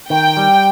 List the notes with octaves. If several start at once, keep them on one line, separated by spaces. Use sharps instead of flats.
D#3 G5
G3